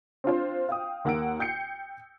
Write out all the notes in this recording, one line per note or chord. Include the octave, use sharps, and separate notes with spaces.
C4 D4 F4 C5
F5 G5 D#6
D#2 A#3 F#5 E6 D7
G5 G6 C7 C#7